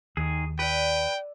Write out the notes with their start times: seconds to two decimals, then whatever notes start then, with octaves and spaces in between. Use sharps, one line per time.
0.17 D#2 D#3 G#4
0.59 B4 D5 G5 E6